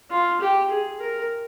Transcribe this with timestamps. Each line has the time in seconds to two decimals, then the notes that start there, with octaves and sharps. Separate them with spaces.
0.11 F4
0.41 G4
0.70 G#4
1.00 A#4